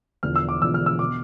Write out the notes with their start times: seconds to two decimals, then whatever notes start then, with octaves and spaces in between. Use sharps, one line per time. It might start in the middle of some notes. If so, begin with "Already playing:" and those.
0.23 E1 E2 D3 F3 F6
0.36 E6
0.49 D6
0.61 E1 E2 D3 F3 E6
0.74 F6
0.86 E6
0.99 B2 D6